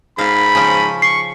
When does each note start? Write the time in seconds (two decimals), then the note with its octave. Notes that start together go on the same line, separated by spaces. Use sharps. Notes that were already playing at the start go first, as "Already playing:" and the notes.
0.19 G#2 F5 B5
0.55 C#3 F3 C#4
1.02 C#6 C7